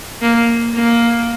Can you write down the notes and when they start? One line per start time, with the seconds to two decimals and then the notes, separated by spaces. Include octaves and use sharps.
0.22 A#3
0.74 A#3